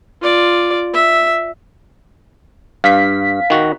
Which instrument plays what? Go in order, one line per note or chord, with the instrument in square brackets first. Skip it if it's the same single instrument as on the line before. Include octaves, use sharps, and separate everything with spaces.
[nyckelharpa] F4 D5
E5
[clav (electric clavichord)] G2 [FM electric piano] F5 B6
[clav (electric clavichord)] D#3 F#4